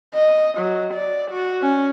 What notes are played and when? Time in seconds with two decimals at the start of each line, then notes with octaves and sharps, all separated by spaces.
0.15 D#5
0.58 F#3
0.94 D5
1.31 F#4
1.62 C#4